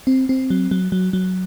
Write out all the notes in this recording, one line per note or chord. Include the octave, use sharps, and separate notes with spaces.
C4
C4
F#3
F#3
F#3
F#3